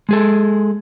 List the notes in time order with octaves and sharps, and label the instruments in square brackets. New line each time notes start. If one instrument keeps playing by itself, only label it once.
[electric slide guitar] G#3 G#4 A4